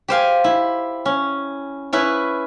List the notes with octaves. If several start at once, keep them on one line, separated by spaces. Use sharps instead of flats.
G4 C5 F5 G#5
E4
C#4
C#4 E4 B4